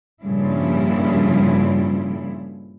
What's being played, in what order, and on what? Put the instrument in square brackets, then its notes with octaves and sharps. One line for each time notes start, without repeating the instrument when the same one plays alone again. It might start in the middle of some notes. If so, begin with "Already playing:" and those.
[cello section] G2 A#2 C#3 F3 G3 E4